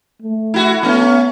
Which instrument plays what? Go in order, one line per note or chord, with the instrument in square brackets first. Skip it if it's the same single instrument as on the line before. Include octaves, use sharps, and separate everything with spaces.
[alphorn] A3
[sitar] E4 F#4
[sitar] A3 C#4 [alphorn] B3